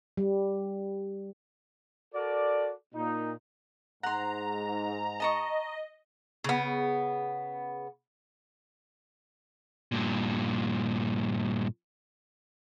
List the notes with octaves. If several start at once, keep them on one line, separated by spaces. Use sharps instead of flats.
G3
F#4 A4 A#4 D5
A#2 D#4
G#2 F#5 A#5 C6
D#5 A5 A#5 C#6
C#3 B3
G2 A#2